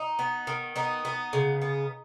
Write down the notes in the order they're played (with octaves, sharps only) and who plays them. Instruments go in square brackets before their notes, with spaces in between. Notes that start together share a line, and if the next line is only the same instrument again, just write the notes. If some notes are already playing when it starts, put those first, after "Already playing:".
Already playing: [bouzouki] D#4
B3
D#3
B3 D#4
B3
C#3
B3